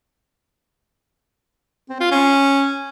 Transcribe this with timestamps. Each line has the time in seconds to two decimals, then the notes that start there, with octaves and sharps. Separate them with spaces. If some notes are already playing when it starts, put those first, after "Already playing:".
1.89 C4
2.00 F4
2.11 C#4